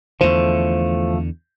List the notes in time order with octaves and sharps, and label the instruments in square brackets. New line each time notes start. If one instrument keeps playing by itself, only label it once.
[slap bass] E2 D3 [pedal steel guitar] F3 A3 [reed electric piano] C5